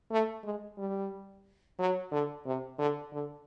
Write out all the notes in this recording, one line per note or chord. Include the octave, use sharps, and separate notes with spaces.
A3
G#3
G3
F#3
D3
C3
D3
D3